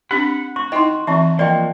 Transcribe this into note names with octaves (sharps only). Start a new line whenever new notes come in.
C4 D4 G4 F#5 B5
F#4 C#6
D#4 E4 D#5 G5 C6
E3 C4 E5 A5 C#6
F3 A#3 F#4 A#4 D5 D#5 G5